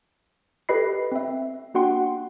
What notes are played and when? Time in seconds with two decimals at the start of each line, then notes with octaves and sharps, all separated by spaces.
0.69 G4 A4 B4 D#5 B5 C7
1.12 C4 E5
1.74 A#3 D4 F#4 F#5 G5 C6